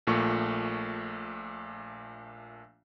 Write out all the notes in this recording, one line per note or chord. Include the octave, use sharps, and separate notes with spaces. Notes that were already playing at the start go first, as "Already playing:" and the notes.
A#1 A#2 A3 C#6